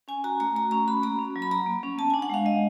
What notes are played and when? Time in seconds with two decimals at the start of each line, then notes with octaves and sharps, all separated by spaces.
0.08 C#4 G#5
0.24 F#4 A#5
0.40 A3 A#5
0.56 A3 A#5
0.71 C#4 A#5
0.88 F#4 B5
1.03 A#3 A#5
1.19 C#4
1.36 F#3
1.42 B5
1.51 F#3 A#5
1.67 A#3
1.83 C#4
1.98 B3 A5
2.10 G#5
2.14 D4
2.22 F#5
2.30 G#3 F5
2.45 G#3 D#5